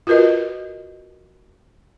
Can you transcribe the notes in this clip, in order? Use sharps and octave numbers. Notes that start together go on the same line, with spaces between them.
F4 F#4 A#4 B4 D#5